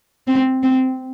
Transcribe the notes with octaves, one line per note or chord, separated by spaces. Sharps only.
C4
C4